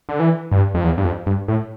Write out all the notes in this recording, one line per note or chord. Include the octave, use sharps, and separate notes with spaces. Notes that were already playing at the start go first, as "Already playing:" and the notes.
D3
E3
G2
F2
E2
G2
F2
G2
A2